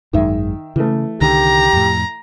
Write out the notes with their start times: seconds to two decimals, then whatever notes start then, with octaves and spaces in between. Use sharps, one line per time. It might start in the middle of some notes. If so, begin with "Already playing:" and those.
0.13 G#1 F#2 D#3 G#3 E5
0.76 C#3 E3 A3
1.21 C2 D3 D#3 G4 A#5
1.73 F2 A2